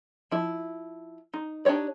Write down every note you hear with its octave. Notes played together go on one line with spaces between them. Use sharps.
F3 E4
D#4
D4 D#4 G4 C#5 D5